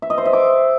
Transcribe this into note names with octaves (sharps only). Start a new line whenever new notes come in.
E5
D#5
C5
E5
D6